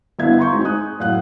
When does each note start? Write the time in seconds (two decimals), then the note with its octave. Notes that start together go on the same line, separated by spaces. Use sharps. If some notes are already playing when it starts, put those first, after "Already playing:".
0.19 G1 D3 B3 E4 F5 G#6
0.39 A#5 C6 C#6 G6
0.53 G#2 G#3 C4 D#4
0.64 G#5 D#6 F#6
0.99 F#2 A2 F5 F#5 F#6